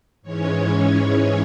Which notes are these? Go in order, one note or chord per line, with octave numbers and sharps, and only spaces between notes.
G#2 E3 G#3 C#4 C#5